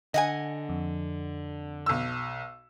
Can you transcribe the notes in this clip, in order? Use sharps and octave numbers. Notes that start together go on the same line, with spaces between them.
D3 D#5 F#5 G#5
F2
B1 E6